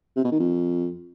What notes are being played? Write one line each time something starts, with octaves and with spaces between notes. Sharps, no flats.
C3
B2
D#3
F2